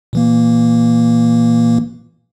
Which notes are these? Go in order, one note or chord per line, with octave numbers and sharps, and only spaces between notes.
A#2 E3 A#3